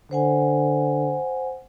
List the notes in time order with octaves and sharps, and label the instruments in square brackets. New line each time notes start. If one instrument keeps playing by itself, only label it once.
[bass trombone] D3 [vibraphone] C5 F#5 G#5